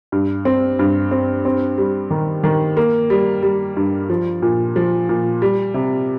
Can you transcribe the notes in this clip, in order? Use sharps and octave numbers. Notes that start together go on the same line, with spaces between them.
G2
C4
G2
C4
C4
G3
D#3
D#3
A#3
G3
G3
G2
F3
A#2
F3
A#2
G3
C3